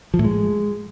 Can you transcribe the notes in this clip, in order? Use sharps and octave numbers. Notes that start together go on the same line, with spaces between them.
F3
A2
G#3